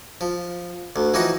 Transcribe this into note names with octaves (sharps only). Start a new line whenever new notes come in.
F3
D2
E3 F3 D#4 F#4 F#5